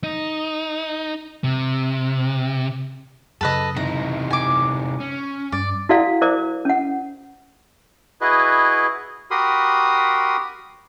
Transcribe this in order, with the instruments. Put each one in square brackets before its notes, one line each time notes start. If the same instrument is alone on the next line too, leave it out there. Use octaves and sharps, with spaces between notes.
[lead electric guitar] D#4
C3
[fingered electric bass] F#2 C#3 [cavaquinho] A4 B4 D#5
[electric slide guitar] C3 D#4 E4 [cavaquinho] A#5
[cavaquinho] G#5 D6
[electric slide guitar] C#4
[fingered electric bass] G2 [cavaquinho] D5
[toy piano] E4 F#4 A4 D5 F5 F#5
E4 A#4 C5 D5 D6
C#4 F#5
[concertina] E4 F#4 G#4 B4 D#5
F#4 G4 A#4 B5 C6 D#6